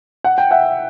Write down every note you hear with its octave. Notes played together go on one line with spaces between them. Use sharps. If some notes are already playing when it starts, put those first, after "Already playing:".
F#5
G5
E5 F#5